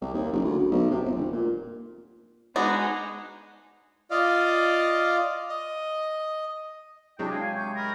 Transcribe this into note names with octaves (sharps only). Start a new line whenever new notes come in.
C2
D#2
F#1
D2
D2
B1
C3
G1
F1
A#2
G#3 B3 D4 D#4 F#4
F4 D5 D#5 F5
D#5
C3 F#3 G#3 D4 E4 G5
F5 G#5
G#5
C#6 G6
A#4 B5 F6